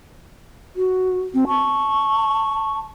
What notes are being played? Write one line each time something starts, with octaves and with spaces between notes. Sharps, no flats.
F#4
C4
A5 C#6